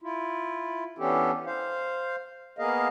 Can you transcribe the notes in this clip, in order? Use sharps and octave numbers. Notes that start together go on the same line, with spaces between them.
E4 F4
E3 B3 C#4 D4 G4 A4
C5 F5
A#3 B3 G#4 A#4 D#5 F5